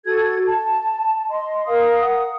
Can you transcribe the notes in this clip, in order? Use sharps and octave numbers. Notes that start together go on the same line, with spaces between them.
F#4 A4 G#6
A5
D#5 C6
A#4 F5 D#6
F#5 D#6